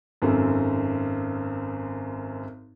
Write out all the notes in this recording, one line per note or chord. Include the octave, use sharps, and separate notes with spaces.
G#1 F#2 A4